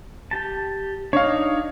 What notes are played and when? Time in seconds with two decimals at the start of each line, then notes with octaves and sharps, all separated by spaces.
0.31 G4 A5
1.13 D4 D#4 C#5 D#5 F5